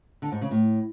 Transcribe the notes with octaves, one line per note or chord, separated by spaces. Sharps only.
D3
G#2
C#3
A2